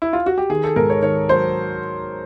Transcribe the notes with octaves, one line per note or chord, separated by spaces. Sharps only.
E4
F4
F#4
G4
D#3 G#4
A4
G#2 A#4
C#5
D#3 C#5
F#3 C5